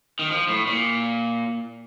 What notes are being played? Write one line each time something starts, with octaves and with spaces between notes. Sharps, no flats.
D#3
F3
A2
A#2